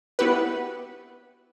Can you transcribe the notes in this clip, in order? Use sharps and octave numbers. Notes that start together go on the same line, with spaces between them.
B3 E4 F#4 G4 B4